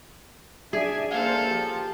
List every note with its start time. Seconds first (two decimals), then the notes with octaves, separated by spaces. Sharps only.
0.73 D4 G#4 D5 E5 G#5
1.11 A#3 C#4 D4 A4 C5 F5
1.47 F3 G4